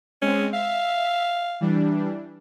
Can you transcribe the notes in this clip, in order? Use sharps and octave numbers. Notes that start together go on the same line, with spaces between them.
G#3 C4 C#4
E5 F5
E3 G3 D4